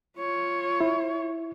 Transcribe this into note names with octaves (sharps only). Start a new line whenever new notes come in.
F4 C#5
E4